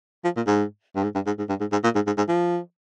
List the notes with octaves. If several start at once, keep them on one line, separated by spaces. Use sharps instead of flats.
F3
A#2
G#2
G2
G#2
G2
G#2
G#2
G2
G#2
G#2
A#2
G#2
G#2
G#2
F3